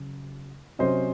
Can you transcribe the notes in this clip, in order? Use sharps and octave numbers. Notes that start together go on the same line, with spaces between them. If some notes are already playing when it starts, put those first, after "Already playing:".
Already playing: C#3 F#3
C3 F#3 C#4 C5 D#5